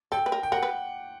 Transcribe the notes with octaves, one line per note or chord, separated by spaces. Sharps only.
A4 G5
B4
A#4
G5
A#4 F#5
B4